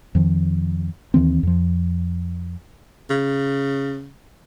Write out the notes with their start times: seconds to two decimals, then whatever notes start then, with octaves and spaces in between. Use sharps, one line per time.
0.15 F2 D#3 F3
1.14 D#2 D#3 E3 C4
1.43 F2 F3
3.10 C#3